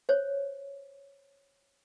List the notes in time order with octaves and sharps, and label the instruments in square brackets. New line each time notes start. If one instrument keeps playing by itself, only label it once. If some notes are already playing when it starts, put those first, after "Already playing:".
[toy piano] C5 C#5